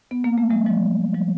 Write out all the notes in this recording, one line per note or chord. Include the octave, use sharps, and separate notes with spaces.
B3
A#3
A3
F#3 G#3
F3 G3
F3 G3